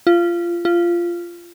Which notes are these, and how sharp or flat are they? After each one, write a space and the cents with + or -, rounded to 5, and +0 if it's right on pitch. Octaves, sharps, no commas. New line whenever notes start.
F4 -20
F4 -15